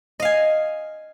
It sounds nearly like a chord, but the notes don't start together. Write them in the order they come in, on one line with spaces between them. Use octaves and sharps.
D#5 F5 G#5